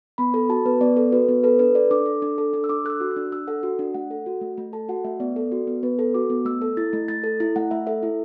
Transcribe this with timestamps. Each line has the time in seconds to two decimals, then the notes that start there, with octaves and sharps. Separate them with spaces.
0.18 B3 B5
0.34 A4 B5
0.49 F#4 A5
0.65 B3 B4
0.81 B3 D5
0.97 A4
1.12 F#4 B4
1.29 B3
1.44 A4 B4
1.59 D4 B4
1.75 A4 D5
1.91 D4 D6
2.06 A4
2.22 D4
2.38 A4
2.54 D4
2.64 E6
2.69 D4 D6
2.85 A4 F#6
2.90 E6
3.00 F#4
3.11 F#6
3.16 D4
3.32 D4 E6
3.47 A4 F#5
3.63 F#4 F#5
3.79 D4
3.94 A3 F#5
4.11 A4
4.26 F#4
4.41 A3
4.57 A3
4.73 A4 A5
4.89 F#4 F#5
5.04 A3 E5
5.20 B3 D5
5.36 A4
5.52 F#4
5.67 B3
5.83 B3 B4
5.99 A4
6.14 F#4 D6
6.30 B3
6.45 A3 E6
6.62 A4
6.77 E4 A6
6.93 A3
7.08 A3 A6
7.24 A4
7.40 E4
7.56 A3 F#5
7.71 A3 E5
7.87 A4 E5
8.03 E4